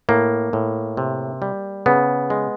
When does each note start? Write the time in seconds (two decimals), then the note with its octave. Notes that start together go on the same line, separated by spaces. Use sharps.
0.09 A2 A#3
0.53 A2
0.97 C3
1.42 G3
1.86 C#3 B3
2.30 G#3